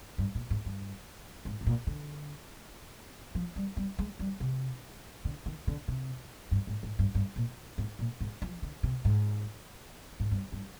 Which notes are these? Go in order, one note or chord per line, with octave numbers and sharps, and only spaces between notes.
G2
A#2
G#2
G2
G#2
G#2
A#2
D3
F3
G3
G3
G#3
G3
C3
D3
D#3
D3
C3
G2
G#2
G#2
G2
G2
A#2
G#2
A#2
G#2
F3
D3
C3
G#2
G#2
G2
G2